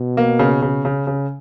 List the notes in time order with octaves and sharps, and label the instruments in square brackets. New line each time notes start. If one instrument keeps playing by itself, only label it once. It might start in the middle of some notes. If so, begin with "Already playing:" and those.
Already playing: [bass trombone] B2
[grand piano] A#3
C#3
C#3
C#3
C#3